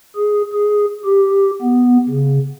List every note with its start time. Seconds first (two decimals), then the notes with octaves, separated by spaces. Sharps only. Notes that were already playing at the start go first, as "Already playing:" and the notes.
0.16 G#4
0.53 G#4
1.05 G4
1.62 B3
2.09 C#3